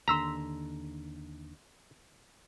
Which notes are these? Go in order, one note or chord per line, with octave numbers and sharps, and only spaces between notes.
D#2 D3 A#5 C6 E6 B6